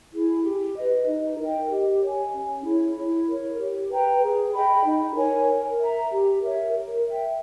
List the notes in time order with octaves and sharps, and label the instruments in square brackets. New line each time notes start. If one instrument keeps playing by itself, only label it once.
[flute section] E4 G#4
G4
B4 D#5
D#4
A#4 D#5 G5
G4
C#5 G#5
C#4
E4 G#4 C#5
E4
A#4 C#5
G4
B4 G5 A#5
G#4
D#5 G5 B5
D#4
A#4 C#5 G#5
A#4
E5 A#5
G4
A#4 C#5 E5
A#4
E5 G5